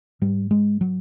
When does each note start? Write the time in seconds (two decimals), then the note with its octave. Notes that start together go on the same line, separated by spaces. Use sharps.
0.22 G#2 G3
0.51 G#3
0.81 F#3